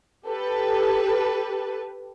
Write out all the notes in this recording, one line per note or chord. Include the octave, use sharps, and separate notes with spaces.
G4 A4 B4